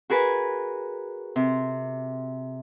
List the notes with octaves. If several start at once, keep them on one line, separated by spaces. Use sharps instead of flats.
F#4 G#4 A#4 B4 G#5
C3